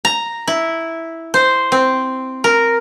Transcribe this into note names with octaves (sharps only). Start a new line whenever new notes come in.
A#5
E4
C5
C4
A#4